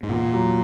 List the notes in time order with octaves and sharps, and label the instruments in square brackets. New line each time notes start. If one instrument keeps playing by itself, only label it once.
[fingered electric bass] G#2
[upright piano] E2 [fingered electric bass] A#2
[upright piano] F#3